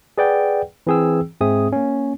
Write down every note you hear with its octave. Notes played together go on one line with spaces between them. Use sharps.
G#4 B4 D5 F#5 G5
E3 C4 G#4 G5 E6
G#2 G#3 C4 G#4 E5 D#6
A#3 C#4